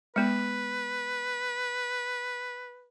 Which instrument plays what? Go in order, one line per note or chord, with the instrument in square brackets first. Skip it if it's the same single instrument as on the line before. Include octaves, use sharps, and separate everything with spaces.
[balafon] G#3 B3 [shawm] B4